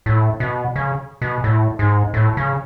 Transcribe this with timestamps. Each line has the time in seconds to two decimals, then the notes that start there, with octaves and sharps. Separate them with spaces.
0.06 A2
0.40 B2
0.76 C#3
1.22 B2
1.44 A2
1.79 G#2
2.14 A2
2.37 C#3